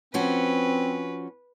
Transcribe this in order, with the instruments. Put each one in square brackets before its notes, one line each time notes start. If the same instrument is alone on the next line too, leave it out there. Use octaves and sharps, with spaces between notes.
[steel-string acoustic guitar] F3 C#4 F#4 [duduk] C4 [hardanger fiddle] B4